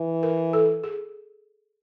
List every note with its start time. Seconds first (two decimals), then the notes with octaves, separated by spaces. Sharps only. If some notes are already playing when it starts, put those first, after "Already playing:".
Already playing: E3
0.23 A#4
0.53 A4
0.84 G#4